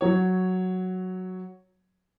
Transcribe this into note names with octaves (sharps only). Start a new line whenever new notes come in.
F#3 C#5